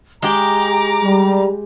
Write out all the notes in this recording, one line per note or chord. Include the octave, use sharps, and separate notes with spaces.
G#3 G4 A#5 D6
G3